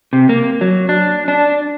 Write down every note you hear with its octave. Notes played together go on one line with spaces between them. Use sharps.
C3
A#3
F#3
D4
D4